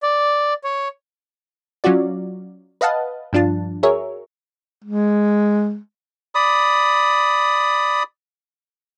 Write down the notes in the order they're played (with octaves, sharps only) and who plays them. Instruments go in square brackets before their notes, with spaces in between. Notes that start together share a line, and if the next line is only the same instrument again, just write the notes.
[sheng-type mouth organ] D5
C#5
[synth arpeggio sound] F#3 C#4 F4 F#4 D5
B4 D#5 F5 F#5 A5
G2 F3 D4 F4 A5
F#4 G#4 A#4 C#5 E5
[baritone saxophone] G#3
[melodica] D5 B5 D#6